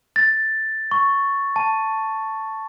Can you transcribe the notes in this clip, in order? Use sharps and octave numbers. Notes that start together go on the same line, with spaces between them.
A6
C#6
A5